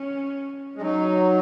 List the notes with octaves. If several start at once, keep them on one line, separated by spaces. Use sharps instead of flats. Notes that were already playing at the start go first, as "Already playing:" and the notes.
Already playing: C#4
G#3
F#3 D#4